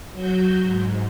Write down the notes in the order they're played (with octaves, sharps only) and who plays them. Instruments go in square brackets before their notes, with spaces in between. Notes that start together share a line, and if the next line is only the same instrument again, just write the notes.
[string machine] F#3 F#4 G6
G#2